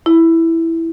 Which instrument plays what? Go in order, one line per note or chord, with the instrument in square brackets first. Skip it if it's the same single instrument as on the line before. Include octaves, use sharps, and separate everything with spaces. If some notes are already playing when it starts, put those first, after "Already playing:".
[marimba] E4